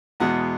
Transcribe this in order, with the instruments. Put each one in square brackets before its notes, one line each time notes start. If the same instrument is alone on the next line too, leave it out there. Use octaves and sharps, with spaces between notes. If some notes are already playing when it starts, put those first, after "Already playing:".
[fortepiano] E2 B2 G#3 F#5